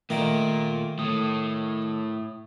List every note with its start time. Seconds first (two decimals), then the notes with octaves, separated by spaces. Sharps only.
0.10 A#2 D#3 A3 A#3 D7
0.99 A2 A3 D#6